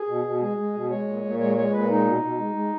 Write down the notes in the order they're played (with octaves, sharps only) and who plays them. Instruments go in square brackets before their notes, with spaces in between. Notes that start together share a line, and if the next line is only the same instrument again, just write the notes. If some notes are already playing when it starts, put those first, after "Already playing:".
Already playing: [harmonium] G#4
B2
B2
G#3 G#4
G#3
B2
G#3 C#5
A#2
A#2
G#3 C#5
G#3 C#5
A#2 B4
G#3 D#4
B2
B2
G#3
G#3